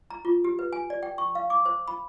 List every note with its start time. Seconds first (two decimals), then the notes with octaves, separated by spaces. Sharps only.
0.10 A#5
0.25 F4
0.44 G4
0.59 B4
0.73 G#5
0.90 D5
1.03 G5
1.18 C#6
1.35 F5
1.50 D6
1.66 C5
1.88 B5